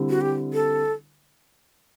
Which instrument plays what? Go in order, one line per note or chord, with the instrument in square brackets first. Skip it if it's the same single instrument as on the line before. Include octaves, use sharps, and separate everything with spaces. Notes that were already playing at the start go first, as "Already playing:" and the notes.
Already playing: [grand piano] D3 G3 C4 E4
[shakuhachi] F#4
G4
A4